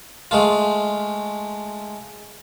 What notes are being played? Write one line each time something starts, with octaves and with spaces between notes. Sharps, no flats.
G#3 A3 F4